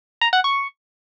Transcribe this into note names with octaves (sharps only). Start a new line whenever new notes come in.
A#5
F#5
C#6